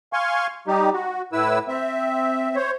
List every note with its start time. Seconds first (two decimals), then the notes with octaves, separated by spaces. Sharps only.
0.13 F5 G#5 C6 C#6
0.68 G3 D#4 G4
0.94 F#4
1.33 A2 E4 B4 E6
1.68 C4 E5
2.56 C5 C#5